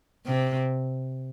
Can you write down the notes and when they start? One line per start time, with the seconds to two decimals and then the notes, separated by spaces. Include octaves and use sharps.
0.26 C3